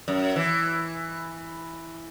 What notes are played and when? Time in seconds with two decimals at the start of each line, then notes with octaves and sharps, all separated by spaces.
0.08 F#2
0.36 E3